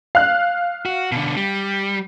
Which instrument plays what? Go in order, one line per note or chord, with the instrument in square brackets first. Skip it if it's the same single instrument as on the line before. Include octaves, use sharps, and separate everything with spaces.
[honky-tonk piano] F5 F#6
[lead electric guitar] F#4
B2 D3
G3